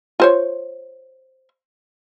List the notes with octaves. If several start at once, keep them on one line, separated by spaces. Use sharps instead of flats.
F4 C5 C#5